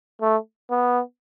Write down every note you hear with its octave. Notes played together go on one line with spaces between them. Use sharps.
A3
B3